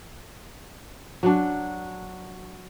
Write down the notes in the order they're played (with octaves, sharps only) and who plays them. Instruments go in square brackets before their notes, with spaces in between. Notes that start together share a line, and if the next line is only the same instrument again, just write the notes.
[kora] F#3 D4